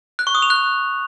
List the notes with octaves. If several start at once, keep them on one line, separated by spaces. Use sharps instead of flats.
F#6
C#6
D#6
F7
F#6